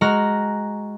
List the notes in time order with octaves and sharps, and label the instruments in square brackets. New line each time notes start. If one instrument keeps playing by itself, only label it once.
[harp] G#3 F#4 A#5 F6